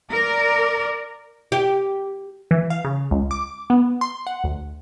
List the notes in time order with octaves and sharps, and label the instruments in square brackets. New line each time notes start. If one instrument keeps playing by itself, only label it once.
[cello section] A#4 D5
[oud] G4
[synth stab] E3
F5
C#3
C#2
D6
B3
C6
F#5
D2